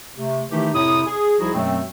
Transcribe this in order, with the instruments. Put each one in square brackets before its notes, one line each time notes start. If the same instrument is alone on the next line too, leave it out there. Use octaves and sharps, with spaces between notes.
[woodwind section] C3 A3
D#3 E3 A3 D#4 E4 G4
F2 A2 C3 E4 C#5 D#6
G#4
C2 F3 D#4 E4 F#4 G#4
F#2 B2 F#3 G#3 A3 C4